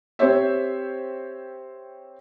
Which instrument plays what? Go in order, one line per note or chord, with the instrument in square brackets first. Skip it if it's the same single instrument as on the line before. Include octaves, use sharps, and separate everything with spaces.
[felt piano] C4 G4 C5 C#5 E5